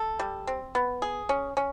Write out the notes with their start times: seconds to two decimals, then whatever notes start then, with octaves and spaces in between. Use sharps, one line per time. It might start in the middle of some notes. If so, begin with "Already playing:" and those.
Already playing: A4
0.19 G3
0.47 C4
0.75 B3
1.02 G#4
1.29 C#4
1.57 C#4